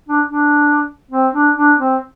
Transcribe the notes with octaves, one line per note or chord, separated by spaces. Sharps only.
D4
D4
C4
D4
D4
C4